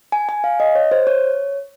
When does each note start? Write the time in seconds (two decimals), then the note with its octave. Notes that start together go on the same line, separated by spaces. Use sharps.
0.12 G#5
0.29 G#5
0.44 F5
0.60 D#5
0.75 C#5
0.91 C5
1.07 C#5